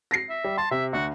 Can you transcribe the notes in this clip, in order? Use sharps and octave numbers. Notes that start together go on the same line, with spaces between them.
A#6 C7
E5
G3
A5 C6
C3 E5
D2 F#4